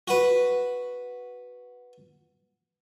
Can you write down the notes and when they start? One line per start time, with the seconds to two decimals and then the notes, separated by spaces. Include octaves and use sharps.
0.08 F#4 B4